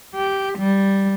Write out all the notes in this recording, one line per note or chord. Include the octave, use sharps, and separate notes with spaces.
G4
G3